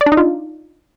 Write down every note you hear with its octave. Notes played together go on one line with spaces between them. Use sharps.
D5
D4
D#4
F4